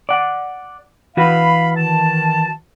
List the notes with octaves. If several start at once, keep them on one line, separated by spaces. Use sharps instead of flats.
D5 F#5
E3 F#4 B4 F5 B5
D#3 A5